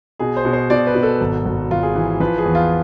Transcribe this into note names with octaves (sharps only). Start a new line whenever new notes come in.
B2 G#4
C5
B2
C5
B2 D5
B4
B2
A4
G#1
G#1
G#1 F4
G#4
E3
F3 B4
G#4
E2
F4